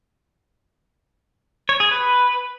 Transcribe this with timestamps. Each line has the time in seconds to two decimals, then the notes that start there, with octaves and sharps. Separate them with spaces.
1.69 C#5
1.80 G#4
1.91 B4